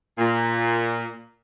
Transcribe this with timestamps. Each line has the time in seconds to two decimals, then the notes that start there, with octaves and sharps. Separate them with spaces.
0.19 A#2